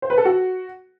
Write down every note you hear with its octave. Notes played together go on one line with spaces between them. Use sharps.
C5
B4
A4
F#4